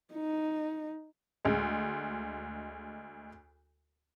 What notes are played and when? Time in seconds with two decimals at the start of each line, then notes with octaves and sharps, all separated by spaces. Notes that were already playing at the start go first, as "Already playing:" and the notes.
0.14 D#4
1.45 D2 G#3